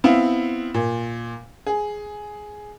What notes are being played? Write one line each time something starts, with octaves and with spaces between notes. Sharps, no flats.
B3 C4 E4 F5
A#2
G#4